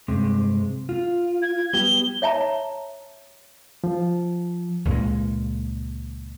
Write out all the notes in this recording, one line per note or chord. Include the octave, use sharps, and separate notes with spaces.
G2 C3 G#3
F4
G#6
G3 B3 G4 G7
C#5 E5 A5 A#5
F3
C#2 A#2 C#3 G#3